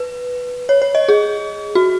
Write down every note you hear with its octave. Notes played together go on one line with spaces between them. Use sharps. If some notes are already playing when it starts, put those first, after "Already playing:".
Already playing: B4
C#5
C#5
D#5
G#4
F#4